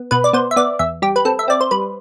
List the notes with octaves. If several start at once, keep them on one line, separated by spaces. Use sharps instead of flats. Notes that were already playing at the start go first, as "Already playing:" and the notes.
Already playing: B3
B2 B4
D5
B3 C5
E5
B3 D5
E2 E5
G3 G4
B4
C4 A4
E5
C4 D5
C5
G3 B4